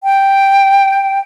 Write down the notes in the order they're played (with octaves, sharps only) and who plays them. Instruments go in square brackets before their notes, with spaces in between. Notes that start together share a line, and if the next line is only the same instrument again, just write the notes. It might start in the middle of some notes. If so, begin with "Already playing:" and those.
[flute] G5